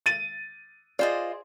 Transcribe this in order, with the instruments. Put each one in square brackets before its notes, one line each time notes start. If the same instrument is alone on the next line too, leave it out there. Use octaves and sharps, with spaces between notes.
[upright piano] A6 D#7
[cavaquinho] F4 C5 D#5 [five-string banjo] G#4 D5